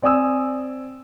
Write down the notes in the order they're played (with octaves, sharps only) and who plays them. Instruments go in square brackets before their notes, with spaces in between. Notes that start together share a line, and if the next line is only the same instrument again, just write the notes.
[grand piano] C4 D5 G#5 D#6 E6